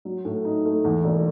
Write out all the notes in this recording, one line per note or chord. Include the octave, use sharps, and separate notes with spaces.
F#3
A2
D#4
A3
E2
E1